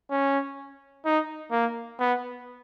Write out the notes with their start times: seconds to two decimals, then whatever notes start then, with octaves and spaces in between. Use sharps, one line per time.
0.10 C#4
1.05 D#4
1.51 A#3
1.99 B3